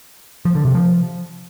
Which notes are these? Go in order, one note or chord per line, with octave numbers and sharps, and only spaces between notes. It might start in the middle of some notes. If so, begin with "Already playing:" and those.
F3
D3
C3
F3